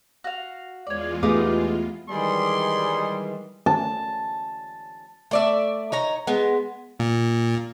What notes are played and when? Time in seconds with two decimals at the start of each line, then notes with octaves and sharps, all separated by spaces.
0.24 F#4 F5
0.87 E2 G#3 F4 C#5 D5
1.23 A3 B3 D#4 G4 G#4 F5 D6
2.10 D#3 E3 G3 G#3 G#4 D#5 G#5 C6
3.66 A5
5.31 A3 D5 E5
5.92 D#4 C#5 A#5
6.27 G#3 B3
7.00 A#2